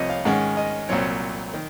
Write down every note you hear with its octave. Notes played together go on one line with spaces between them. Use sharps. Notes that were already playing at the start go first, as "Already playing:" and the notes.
Already playing: C2 C3 F3 C#5 D#5
F5
G#2 D#3 G#3 C#4 F#5
D#5
C2 A#2 F#3 C4 C#5
D#3